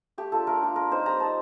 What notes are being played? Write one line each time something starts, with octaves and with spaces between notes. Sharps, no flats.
A3 G4
D4 F4 A4
A3 A#4
D4 F4
G3 A#4
C4 D#4 C5
G3 A#5
C4 D#4 A5